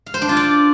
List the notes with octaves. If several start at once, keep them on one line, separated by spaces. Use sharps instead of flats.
F5
C5
D4
F4
D5